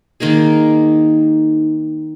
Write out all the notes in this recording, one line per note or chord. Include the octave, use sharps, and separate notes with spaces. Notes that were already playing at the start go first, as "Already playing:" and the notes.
D#3 A#3 D#4 G#4